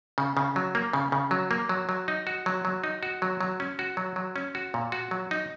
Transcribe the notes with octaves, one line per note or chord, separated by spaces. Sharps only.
C#3
C#3
F#3
A#3
C#3
C#3
F#3
A#3
F#3
F#3
D#4
F#4
F#3
F#3
D#4
F#4
F#3
F#3
C#4
F#4
F#3
F#3
C#4
F#4
A#2
F#4
F#3
D#4